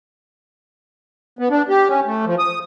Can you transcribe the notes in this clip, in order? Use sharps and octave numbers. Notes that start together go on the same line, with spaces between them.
B3
D4
G4
C#4
A3
F3
D#6